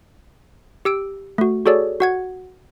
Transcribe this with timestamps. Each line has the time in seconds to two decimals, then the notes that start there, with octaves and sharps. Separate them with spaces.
0.85 G4 E6 D7
1.38 A3 F#4
1.66 F#4 G#4 A4 C#5 D5
2.00 F#4 F#5 G#6